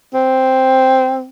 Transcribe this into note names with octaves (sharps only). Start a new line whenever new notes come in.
C4